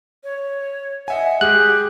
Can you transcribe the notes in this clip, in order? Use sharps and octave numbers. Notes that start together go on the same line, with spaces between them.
C#5
D#5 E5 F#5 G#5
G#3 G4 G#4 F#6